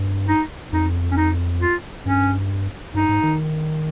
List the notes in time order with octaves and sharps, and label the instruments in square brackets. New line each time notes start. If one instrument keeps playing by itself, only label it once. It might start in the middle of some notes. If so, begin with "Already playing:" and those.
Already playing: [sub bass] G2
[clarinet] D#4
[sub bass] F2 [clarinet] D#4
[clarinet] C#4
D#4
F4
[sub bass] G2 [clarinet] C#4
[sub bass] G2 [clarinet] D#4
[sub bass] G#2
D#3